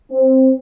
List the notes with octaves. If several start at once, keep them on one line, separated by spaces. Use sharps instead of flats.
C4